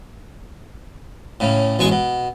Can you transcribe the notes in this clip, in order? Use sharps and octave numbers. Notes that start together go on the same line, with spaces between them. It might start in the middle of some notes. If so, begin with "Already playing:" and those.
A2 C#3
A1 B2 G#3 C#6
B2